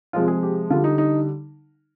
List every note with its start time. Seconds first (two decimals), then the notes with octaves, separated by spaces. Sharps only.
0.13 C3 F3 G#3 F4
0.28 G#4
0.43 G4
0.70 D3 G3 F4
0.84 D#4
0.98 D#4